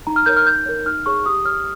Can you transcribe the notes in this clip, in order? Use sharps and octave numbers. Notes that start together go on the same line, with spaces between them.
D#4 A#5
F6
A#4 C#5 G6
F6
D#4 G6
A#4 C#5
D#4 F6
G#4 C#5 C#6
G4 D#6
C#5 F6